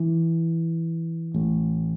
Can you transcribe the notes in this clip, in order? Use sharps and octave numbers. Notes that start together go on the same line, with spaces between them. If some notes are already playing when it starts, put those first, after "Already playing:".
Already playing: E3
A1 A2